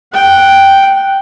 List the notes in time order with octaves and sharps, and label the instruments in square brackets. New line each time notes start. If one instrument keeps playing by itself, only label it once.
[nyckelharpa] F#5 G5